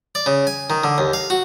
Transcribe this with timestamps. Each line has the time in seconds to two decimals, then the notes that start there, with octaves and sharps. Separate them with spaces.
0.15 D5
0.26 C#3
0.47 G#5
0.70 D#3
0.84 D3
0.98 D#2
1.13 F5
1.30 F#4